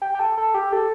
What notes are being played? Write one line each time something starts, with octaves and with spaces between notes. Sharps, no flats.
G4
G4
A4
A4
G4
A4